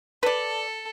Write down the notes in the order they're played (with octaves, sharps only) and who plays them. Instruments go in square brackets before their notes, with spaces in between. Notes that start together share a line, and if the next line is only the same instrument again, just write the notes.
[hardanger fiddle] A4 [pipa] B4 D5